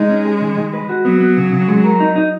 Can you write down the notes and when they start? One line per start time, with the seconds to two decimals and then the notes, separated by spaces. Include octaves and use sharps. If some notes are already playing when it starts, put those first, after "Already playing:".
Already playing: G#3 D#4
0.10 C#4
0.25 G#4
0.41 D#3
0.57 D#3
0.73 B4
0.89 F#4
1.05 F#3 B3
1.21 B3
1.37 C#3
1.53 C#3
1.68 G#3
1.84 A#4
2.00 D#4
2.16 D#4